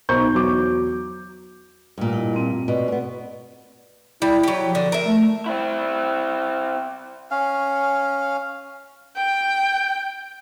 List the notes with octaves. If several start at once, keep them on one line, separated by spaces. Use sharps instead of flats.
B1 D#4 C5 C#6 G6
E2 F#3 D6
G2 A#2
E4 D#5 F#5
A#3 C4
B2 D5
B3 C#4
G3 E4
F#3 G4
F3
D3
A#4 E5
A3
C4 E4
C#4 F5
G5